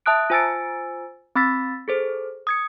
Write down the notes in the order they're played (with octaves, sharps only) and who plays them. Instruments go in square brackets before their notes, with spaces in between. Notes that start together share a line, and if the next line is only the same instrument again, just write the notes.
[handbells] E5 A5 D#6 F#6 D7
F4 C5 G#5 E6 A6 D7
C4 B5 E6 A6 B6
G#4 A4 C5
D#6 G#6 C#7